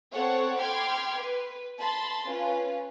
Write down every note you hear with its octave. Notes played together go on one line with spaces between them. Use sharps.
C4 A4 C#5 F#5
G5 B5 C6 D6 F6 G#6
B4
A5 B5 C6 A6
C#4 F4 B4